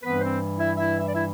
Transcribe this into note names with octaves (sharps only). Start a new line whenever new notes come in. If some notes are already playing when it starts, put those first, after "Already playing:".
G2 E3 G3 B3 C4 B4
C4 C5
E4 E5
E4 E5
E5
D5
E4 E5